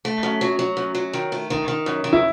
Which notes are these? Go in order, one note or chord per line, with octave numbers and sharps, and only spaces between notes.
A3
F#2
F#3
F#3
F#2
F#3
D#3
A3
D#3
D#3
F#2
D#3
E4